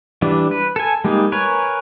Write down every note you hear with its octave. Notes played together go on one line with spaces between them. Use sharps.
E3 G3 D4
B4
A4 G#5
G3 G#3 A#3 D#4
A#4 B4 C#5 G#5